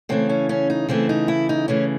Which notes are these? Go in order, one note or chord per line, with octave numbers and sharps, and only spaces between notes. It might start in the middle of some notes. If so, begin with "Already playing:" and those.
C#3 E3 A3 C4
C#4
C#4
D#4
C#3 E3 A3 C4
D#4
E4
D#4
C#3 E3 A3 C#4